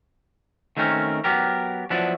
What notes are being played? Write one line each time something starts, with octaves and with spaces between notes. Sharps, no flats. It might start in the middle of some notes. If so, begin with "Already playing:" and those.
D#3 A3 C4 C#4 A#4
F#3 B3 G4 A#4
F3 F#3 B3 D4 E4